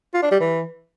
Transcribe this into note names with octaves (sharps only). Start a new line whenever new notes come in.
F4
D4
G3
E3